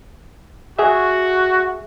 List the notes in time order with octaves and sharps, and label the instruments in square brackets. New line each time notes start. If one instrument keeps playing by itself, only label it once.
[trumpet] F#4 [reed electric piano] G#4 E5